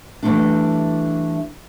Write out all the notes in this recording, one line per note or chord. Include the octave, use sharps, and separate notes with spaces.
E3 F3 G3 A3 D4